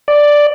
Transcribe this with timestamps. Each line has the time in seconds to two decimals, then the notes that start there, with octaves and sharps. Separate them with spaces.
0.08 D5